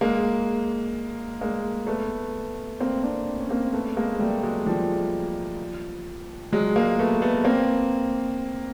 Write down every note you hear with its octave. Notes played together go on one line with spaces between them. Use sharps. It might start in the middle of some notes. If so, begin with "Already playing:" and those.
G#3 A#3
G#3 A#3
A3 B3
A#3 C4
C4 D4
C#4
A#3 C4
A3 B3
G#3 A#3
G3 A3
F#3 G#3
F3 G3
F#3 G#3
G#3 A#3
A3 B3
A3 B3
A#3 C4